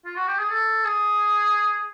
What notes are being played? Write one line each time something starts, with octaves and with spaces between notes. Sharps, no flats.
F4
F#4
G4
G#4
A4
G#4